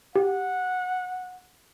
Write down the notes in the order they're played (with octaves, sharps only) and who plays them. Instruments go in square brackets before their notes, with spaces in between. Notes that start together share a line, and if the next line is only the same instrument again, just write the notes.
[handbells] G4 [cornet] F#5